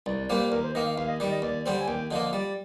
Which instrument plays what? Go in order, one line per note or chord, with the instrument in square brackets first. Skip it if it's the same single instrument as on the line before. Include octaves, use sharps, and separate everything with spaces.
[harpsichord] C2 [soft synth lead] D5
[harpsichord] A#2 G3 A#3 [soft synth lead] C5
[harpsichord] D#2 [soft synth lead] A#4
[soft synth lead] C5
[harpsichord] D#3 A#3 [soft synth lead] D#5
[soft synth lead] F5
[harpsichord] D#2 [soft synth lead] F5
[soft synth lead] D#5
[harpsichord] D#3 G3 [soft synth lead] D5
[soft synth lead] D#5
[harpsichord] D#2 [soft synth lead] D5
[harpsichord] D3 G3 C4 [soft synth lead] C5
[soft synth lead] G#5
[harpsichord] D#2 [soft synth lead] G5
[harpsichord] D3 F3 A#3 [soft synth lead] D#5
[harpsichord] G3 [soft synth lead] D5